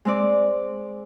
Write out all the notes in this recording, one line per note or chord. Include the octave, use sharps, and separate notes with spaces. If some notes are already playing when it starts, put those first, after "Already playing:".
G#3 C4 D5